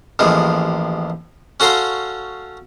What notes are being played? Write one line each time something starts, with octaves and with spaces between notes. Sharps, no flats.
A1 D#2 F3 G#3
C#4 F#4 A4 F5 A#5 C6